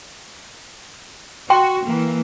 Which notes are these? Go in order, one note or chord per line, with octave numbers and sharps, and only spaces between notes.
F#4 G5 C6
E3 A#3